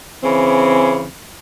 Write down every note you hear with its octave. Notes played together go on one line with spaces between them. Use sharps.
C#3 E3 C4